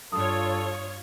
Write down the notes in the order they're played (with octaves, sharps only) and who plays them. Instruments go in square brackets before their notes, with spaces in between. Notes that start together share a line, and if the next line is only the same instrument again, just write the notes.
[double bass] G2 [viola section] F4 C#5 [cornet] A4 [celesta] D#6